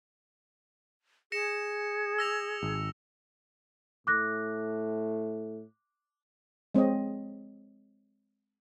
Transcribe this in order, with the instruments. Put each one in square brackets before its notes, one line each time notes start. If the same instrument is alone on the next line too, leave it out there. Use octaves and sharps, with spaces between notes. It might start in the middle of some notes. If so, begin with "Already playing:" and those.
[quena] G#4 [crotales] A#6 C#7 E7
[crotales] E6 A#6 F7
[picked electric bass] G#1
[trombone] A2 [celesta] D6 F#6 A#6
[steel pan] G#3 C4 C#5 D#5